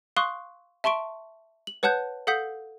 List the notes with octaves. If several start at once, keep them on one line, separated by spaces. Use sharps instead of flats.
F5 C6 C#6 D#6 F#6
E5 A5 C6 C#6 D7
F#7
B4 C#5 F#5 A5 F#6 G6
A4 F5 F#5 D#6 G6 B6